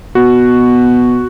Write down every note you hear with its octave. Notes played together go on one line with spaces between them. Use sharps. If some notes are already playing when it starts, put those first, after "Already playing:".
B2 F#4